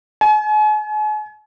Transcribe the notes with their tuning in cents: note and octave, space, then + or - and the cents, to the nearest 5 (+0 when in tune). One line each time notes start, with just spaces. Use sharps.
G#5 +40